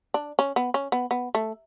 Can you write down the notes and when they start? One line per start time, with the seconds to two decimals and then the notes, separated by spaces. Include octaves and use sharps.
0.14 D4
0.39 C#4
0.56 B3
0.74 C#4
0.92 B3
1.11 B3
1.35 A3